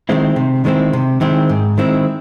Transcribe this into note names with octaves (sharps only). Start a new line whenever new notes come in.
D#3 G#3 C4 E4
C3
D#3 G#3 C4 E4
C3
D#3 G#3 C4 E4
G#2
D#3 G#3 C4 E4